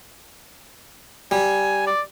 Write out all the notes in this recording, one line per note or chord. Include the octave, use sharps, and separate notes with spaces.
G3 G#5
D5